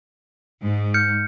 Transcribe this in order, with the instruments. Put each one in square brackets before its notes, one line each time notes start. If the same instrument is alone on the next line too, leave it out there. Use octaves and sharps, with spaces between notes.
[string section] G#2
[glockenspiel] F6 G6 C#7